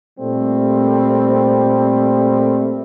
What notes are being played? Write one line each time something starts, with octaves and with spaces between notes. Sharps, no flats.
A#2 G3 A3 C4